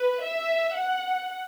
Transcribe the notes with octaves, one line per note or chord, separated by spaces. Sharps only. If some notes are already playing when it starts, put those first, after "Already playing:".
Already playing: B4
E5
F#5